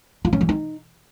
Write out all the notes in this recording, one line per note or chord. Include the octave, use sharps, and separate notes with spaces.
F4
C#4
E3
D#4